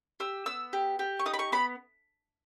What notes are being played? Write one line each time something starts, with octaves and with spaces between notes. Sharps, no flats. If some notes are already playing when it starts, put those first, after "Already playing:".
G4 E6
B3 E6
G4
G4
C#6
D#4 D#6
B5
C#6
B3 B5